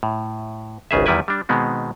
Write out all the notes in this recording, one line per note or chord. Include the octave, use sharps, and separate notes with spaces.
A2
G#1 C#2 C#3 G#4 E5
E2 D#3 G3 E4 B4 G#5
G3 D4
B2 D#3 G#3 B3 C4